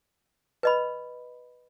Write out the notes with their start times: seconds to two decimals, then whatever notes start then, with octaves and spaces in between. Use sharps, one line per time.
0.63 B4 D#5 B5